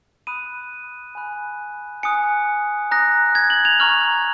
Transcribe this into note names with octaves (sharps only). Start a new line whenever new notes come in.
B5 D#6 F#6 D#7
G#5 B5 F#6
G#5 D#6 F#6 C#7
A#5 D#6 F#6 A#6
G#6
F#7
F7
A#5 C#6 F6 F#7